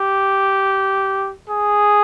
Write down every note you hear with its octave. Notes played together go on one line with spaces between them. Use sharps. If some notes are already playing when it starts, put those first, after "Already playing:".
Already playing: G4
G#4